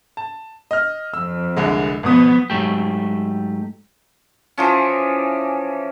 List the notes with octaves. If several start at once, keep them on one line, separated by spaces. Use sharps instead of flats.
A5
D#5 F6
F2 E6
C2 D3 G#3
G#1 B2 F3 B3 D#6
G#2 E3 F#3 A3 G4
E3 F3 C#4